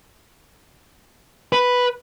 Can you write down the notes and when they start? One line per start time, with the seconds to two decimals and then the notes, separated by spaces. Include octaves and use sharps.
1.53 B4